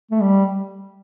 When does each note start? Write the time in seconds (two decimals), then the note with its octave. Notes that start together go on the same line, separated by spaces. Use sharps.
0.11 A3
0.21 G3